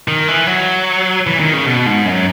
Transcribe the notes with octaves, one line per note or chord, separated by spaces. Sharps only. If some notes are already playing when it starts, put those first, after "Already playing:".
D#3
E3
F#3
E3
D#3
C#3
B2
G#2
F#2